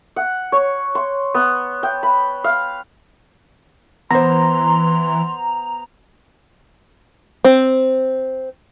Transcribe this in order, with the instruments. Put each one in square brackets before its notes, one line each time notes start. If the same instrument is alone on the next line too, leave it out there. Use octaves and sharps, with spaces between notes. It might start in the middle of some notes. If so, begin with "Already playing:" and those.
[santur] F#5
C#5
C6
B3
G5
B5
F5
[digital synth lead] E3 [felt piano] B3 C5 [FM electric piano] A#5 [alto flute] C6
[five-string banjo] C4